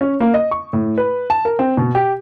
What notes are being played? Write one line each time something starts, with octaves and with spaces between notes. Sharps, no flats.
C#4
A#3
D#5
C#6
A2
B4
A5
A#4
C4
B2
G4